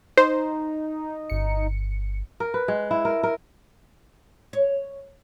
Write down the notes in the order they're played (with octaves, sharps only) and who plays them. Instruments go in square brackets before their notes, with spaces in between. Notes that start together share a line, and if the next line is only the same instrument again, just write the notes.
[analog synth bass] D#4 [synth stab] C5
[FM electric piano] G1 C#7
[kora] A#4
B4
G#3
E4
A#4
A#4
[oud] C#5